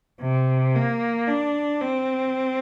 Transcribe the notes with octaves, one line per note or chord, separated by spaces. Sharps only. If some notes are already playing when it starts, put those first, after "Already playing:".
C3
A#3
D4
C4